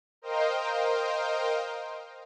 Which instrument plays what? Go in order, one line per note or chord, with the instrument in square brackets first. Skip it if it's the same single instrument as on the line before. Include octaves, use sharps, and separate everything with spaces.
[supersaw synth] A#4 C5 D#5 F5 G5